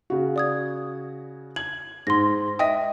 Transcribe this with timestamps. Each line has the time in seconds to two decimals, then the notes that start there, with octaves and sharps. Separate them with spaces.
0.10 C#3 F#4
0.36 D5 D#6 G#6
1.56 G#6 F#7
2.07 G#2 C6 A#6
2.59 D#5 E5 G5 D#6